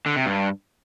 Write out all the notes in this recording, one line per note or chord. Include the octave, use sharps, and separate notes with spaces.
D3
C3
G2